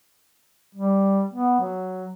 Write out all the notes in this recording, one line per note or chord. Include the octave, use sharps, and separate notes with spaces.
G3
B3
F#3